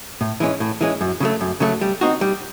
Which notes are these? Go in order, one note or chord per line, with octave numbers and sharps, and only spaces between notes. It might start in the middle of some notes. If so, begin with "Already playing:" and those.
A2
E3 G#3 C#4
A2
E3 G#3 C#4
F#2
C#3 F#3 A3
F#2
C#3 F#3 A3
G3
C4 D#4 F#4
G3